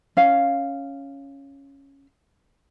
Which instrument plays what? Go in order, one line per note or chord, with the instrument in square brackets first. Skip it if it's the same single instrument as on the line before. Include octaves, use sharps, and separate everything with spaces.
[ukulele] C#4 F5